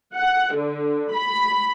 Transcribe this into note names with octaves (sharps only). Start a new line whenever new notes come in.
F#5
D3
B5